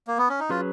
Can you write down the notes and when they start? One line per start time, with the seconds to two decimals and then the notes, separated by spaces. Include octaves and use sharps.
0.07 A#3
0.18 B3
0.29 C#4
0.40 D#4
0.49 F#3 C#4 F4 G#4 B4